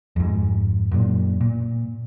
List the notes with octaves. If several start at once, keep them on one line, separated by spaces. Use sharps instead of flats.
F2 G#2
F#2 A#2
A#2